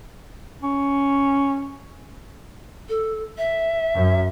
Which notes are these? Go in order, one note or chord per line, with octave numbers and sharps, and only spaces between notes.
C#4
A4
E5
F#2